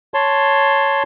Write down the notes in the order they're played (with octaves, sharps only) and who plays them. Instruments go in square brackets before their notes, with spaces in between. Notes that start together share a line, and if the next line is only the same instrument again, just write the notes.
[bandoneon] C#5 A5 C6